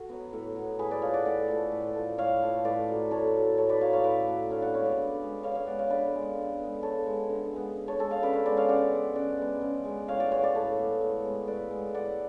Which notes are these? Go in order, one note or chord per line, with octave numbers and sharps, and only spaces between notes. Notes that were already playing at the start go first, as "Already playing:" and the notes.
Already playing: F#4 A4
F#3 B3
A2
F#3 B3
A2 G#4 B4
B4 D5
F3 A3 C#5 F5
D5 F#5
A2 D5 F#5
F3 A3
A2
F3 A3
A2 C#5 F5
F3 A3
A2 B4 D5
F#3 A3
A2 A4 C#5
F#3 A3
A2 A4 C#5
B4 D5
F#3 A3 C#5 F5
C#5 F5
A2 B4 D5
F#3 A3
D3 C#5 F5
D5 F#5
G#3 B3 C#5 F5
B4 D5
D3
G#3 B3
D3 C#5 F5
C#5 F5
G#3 B3 D5 F#5
C#5 F5
D3 B4 D5
G#3 B3
D3
G#3 B3
D3 A4 C#5
G#3 B3
D3
G#3 B3
D3
A4 C#5
G#3 B3 A4 C#5
C#5 F5
C#3 B4 D5
C#5 F5
G#3 B3 B4 D5
C#5 F5
C#3 D5 F#5
G#3 B3
C#3 D5 F#5
G#3 B3
C#3
G#3 B3
A2 C#5 F5
D5 F#5
G#3 B3 C#5 F5
B4 D5
A2 A4 C#5
G#3 B3
A2
G#3 B3
A2 B4 D5
G#3 B3
A2 D5 F#5